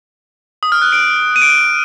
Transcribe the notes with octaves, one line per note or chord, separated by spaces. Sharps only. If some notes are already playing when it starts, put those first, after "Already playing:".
D#6
F6
F#6
D7
D#7
D7